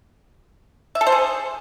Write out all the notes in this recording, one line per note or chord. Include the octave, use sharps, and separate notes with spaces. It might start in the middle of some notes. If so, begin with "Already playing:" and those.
E5
A4
C5
G#4